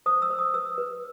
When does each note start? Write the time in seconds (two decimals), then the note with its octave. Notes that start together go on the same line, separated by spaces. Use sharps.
0.06 C5 D#6
0.22 E6
0.30 C5
0.39 D#6
0.54 B4 E6
0.78 B4